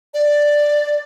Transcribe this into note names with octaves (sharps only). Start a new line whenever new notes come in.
D5